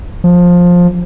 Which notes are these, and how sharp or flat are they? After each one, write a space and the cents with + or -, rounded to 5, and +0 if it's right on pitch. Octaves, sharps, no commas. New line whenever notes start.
F3 +15